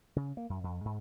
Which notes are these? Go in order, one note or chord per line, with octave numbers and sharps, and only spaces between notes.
C#3
A#3
F#2
F2
G#2